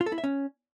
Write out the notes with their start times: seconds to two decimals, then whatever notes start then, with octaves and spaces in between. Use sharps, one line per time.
0.01 F4
0.06 A4
0.12 E4
0.18 E5
0.24 C#4